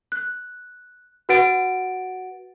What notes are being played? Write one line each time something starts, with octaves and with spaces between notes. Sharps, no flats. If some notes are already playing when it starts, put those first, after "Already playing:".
F#6
F#4 B4 F#5 A6 D7